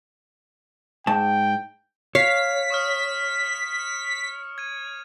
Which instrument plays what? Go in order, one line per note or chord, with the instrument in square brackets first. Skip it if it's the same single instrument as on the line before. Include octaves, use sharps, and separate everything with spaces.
[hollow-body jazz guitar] G#2 A5 [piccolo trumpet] G5
[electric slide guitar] C#5 [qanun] F5 [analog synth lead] B6
[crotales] C#6 D#6 F6
G#6 D#7